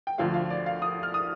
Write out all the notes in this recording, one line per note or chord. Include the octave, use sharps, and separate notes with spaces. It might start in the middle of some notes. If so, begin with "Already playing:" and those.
G5
D2 D3 F3 A3 F5
F5
D5
F5
D#6
F6
D#6